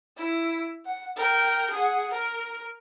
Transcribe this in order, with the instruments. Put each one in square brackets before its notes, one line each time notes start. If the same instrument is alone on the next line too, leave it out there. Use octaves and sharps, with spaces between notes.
[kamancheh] E4
F#5
A#4 G5
G#4 F#5
A#4